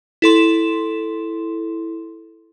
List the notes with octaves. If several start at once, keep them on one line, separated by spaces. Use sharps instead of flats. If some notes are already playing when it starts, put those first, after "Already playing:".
E4 A4 C6